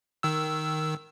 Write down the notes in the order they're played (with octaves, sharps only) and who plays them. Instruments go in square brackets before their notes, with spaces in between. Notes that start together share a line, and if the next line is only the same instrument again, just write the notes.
[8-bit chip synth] D#3 E6